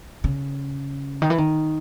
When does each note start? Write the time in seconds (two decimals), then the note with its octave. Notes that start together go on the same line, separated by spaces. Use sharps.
0.24 C#3
1.22 D#3
1.30 E3
1.38 D#3